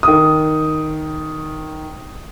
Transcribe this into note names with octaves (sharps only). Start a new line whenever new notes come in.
D#3 D#6